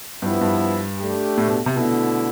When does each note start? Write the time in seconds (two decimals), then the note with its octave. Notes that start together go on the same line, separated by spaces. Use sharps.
0.22 G2 F3 B3 E4
0.41 G2
0.99 A3 D4 G4
1.37 A2
1.47 B2
1.66 C3
1.75 B2 D3 A3 E4